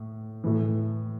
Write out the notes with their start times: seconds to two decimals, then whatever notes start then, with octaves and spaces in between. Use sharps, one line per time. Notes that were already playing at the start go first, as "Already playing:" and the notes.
Already playing: A2
0.44 A2 E3